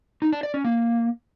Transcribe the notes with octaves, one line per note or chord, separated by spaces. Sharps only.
D#4
D4
D5
C#4
A#3